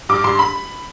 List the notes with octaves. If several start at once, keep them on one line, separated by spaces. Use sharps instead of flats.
G2 D6
G2 C6
B5